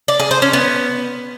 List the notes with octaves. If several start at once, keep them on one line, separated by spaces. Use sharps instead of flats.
D5
G#4
C5
C#4
B3